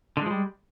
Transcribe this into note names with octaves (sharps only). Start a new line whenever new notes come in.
D3 F3 G3 G#3